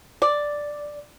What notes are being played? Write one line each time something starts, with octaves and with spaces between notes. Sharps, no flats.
D5